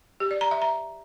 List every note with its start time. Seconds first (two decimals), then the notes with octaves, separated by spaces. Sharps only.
0.20 G4
0.31 D5
0.41 A#5
0.51 E5
0.62 A#5